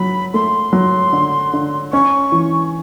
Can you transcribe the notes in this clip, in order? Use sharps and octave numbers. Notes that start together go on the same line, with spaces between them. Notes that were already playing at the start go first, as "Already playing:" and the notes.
Already playing: D3 F#3 B5
A3 C6
F#3
D3
D3
C#4 C#6
E3